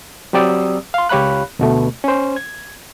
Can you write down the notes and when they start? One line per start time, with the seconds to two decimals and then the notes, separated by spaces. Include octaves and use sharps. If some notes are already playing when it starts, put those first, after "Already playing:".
0.33 F#3 C4 G4 D5 D#6 E6
0.94 F5 C6
1.09 C#2 G4 C#5 F5 B5 F#6
1.59 D2 B2 A3
2.04 C#4 C5
2.36 G#6